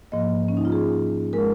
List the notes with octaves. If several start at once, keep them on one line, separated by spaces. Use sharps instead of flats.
G#2 F3 A#3 D#5
C#4
D#4
F4
G#4
G#3 A#4